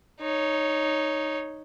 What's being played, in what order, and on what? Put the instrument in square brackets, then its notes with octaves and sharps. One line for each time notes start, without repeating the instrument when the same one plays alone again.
[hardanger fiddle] D#4 C#5